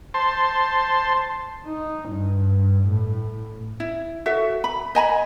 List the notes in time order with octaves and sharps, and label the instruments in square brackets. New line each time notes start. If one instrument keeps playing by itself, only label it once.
[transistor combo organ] C5 A5 C6
[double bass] D#4
G2
A2
[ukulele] E4
F#4 A4 E5
B5
D#5 G#5 A#5 B5